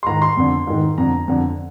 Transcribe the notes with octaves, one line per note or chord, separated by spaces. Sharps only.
C6
G#2 D#3 A#5
C6
F2 D3
G#2 D#3
F2 D3 A#5
F2 D3